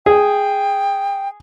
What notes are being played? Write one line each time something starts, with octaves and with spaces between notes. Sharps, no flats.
G#4 G5